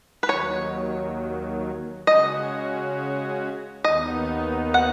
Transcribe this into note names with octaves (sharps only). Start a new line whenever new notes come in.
B4
D#2 D#3 F#3 C#5
C#3 G#3 C#4 F#4 D#5
D#2 D#3 B3 D#4 D#5
F#5